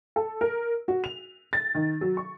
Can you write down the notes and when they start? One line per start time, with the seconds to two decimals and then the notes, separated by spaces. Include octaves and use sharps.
0.16 A4
0.41 A#4
0.88 F#4
1.04 F7
1.53 A6
1.75 D#3
2.01 F#3
2.17 C#6